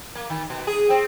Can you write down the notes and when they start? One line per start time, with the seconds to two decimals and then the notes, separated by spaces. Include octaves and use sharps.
0.15 A#3
0.30 D#3
0.50 B2
0.67 G#4
0.90 C4